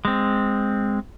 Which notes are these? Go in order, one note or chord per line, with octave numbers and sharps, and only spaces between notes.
G#3 C4